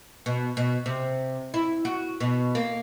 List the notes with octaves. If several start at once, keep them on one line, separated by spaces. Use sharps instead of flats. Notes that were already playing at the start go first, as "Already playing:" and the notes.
B2
B2
C3
E4
F#4
B2
A#3